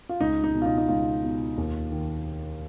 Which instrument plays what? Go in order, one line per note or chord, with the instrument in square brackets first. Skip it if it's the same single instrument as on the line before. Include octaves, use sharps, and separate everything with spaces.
[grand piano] F4
C#2 D#4
D#4
B2
F4
D#4
D#4
C#2 F4
B2
D#2
D#3